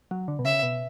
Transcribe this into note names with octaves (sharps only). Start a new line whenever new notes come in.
F#3
D3
B2
C#3 E5
B2